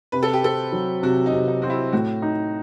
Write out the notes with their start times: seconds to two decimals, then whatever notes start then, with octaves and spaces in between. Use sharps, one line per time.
0.12 C3 B4
0.23 A4
0.33 G4
0.43 C4 A4
0.72 F#3
1.03 C3 F#4
1.26 D#4
1.32 C3
1.48 D#4
1.62 C4 F#4
1.70 E4
1.93 A2 F#4
2.22 D#4